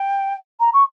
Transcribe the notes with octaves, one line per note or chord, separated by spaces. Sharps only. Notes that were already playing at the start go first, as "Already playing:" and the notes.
Already playing: G5
A#5
C#6